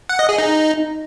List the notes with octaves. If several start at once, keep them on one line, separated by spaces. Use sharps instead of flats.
F#5
D#5
G#4
D#4